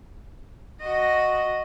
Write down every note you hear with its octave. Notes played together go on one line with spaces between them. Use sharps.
F#4 D#5